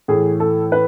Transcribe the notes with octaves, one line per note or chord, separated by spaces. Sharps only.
A2 E3 G#4
A4
B4